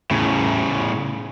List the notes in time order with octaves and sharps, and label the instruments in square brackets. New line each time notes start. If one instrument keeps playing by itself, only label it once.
[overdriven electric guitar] A2 C#3